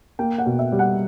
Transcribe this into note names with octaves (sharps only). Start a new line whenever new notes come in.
A#3 G5
F#5
B2
E5
G3
F#5